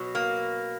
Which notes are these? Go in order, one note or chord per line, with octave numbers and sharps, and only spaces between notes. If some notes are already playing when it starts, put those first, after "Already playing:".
Already playing: B2 F#3
A#3